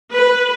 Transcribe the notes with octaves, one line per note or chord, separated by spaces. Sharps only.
B4